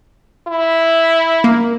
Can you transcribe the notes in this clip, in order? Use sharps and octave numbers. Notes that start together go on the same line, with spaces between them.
E4
A#3